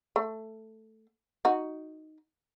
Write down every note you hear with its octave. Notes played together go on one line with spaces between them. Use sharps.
A3
D#4 F#4